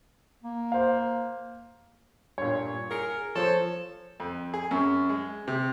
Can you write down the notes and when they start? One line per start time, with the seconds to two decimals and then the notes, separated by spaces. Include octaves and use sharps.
0.43 A#3
0.72 C5 F5
2.38 G2 A#2 C#5
2.91 G#4 A#4 C#7
3.36 F3 A4 C5 C#5
4.20 F2
4.54 G#4
4.71 F#2
5.09 G#3
5.48 C3